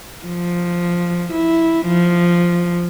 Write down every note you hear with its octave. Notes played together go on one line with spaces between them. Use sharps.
F3
E4
F3